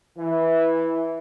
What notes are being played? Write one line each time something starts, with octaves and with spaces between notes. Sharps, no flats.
E3